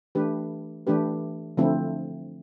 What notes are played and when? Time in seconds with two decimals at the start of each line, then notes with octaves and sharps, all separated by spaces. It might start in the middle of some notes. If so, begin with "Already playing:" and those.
0.15 E3 A3 D4 G4 B4
0.87 E3 A3 D4 G4 B4
1.57 D3 F3 A3 C4 E4